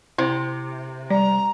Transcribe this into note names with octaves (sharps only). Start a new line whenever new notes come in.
C3 E4 C5
G3 D5 A#5